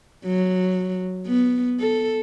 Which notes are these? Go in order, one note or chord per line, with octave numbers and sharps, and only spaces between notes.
F#3
B3
A4